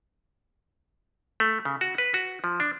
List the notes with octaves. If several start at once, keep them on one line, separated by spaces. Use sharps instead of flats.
A3
C#3
F#4
B4
F#4
F3
D4